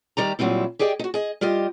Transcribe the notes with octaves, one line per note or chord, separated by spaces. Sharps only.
D#3 G3 D5 A#5
A#2 F#3 G3 C4 E4
G4 G#4 D5 D#5 G5
D#4 F#4
G#4 D#5
G3 F4 G4 D#5